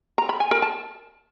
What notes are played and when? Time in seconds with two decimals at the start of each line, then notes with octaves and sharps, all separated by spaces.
0.18 A#5
0.29 B5
0.40 G#5
0.51 A#4
0.62 A5